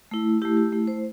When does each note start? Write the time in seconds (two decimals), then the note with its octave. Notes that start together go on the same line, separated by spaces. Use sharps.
0.11 A3 E4
0.42 A3 E4 G4
0.57 G4
0.72 A3 E4
0.87 C5